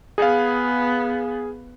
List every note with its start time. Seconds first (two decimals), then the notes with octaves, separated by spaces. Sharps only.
0.18 B3 G#4 F5